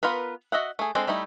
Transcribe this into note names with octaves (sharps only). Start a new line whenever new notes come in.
B3 F4 A#4 B4
F#4 D#5 E5 F#5
A3 G#4
G#3 C4 D4 A4 D5
G3 A3 D#4 E4